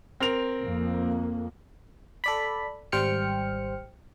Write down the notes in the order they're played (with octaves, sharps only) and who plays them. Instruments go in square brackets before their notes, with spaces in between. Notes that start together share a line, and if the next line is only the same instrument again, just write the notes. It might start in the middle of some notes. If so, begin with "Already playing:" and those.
[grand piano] C4 A#4 F7
[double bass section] F2 A#3
[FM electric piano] A4 D5 B5
G#1 G3 C5 G5 F6 C#7